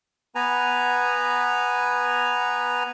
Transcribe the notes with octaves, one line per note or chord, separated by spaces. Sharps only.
B3 B4 G#5 A#5